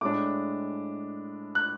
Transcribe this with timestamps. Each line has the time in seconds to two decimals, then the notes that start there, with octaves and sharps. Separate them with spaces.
0.01 A2 G#3 D4 D6
1.55 F#6